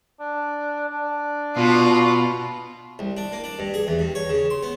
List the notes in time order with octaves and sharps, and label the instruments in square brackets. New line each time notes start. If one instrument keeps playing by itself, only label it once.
[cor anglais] D4
D4
[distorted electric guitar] B2 [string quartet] F4
[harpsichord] C2
D4
A#3
D4
G2
G#4
E2
G2
C#5
C#3
C6
B3